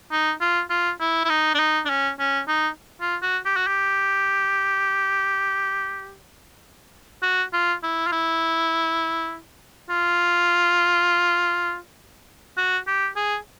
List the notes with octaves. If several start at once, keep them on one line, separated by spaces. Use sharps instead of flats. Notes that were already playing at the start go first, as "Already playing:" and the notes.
D#4
F4
F4
E4
E4
D#4
D4
D#4
D4
C#4
C#4
D#4
F4
F#4
G4
F#4
G4
F#4
F4
E4
F4
E4
F4
F#4
G4
G#4